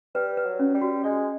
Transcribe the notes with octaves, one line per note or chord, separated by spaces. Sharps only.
G3 B4
B4
F#3
C#4
G3
F#4
G#3 D5